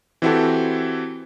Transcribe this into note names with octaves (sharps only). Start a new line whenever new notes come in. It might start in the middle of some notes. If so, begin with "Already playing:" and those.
E3 C4 E4 F#4 G4 A4